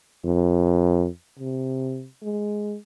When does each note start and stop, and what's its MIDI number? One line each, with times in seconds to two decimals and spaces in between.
0.25 1.07 41
1.39 2.07 48
2.23 2.76 56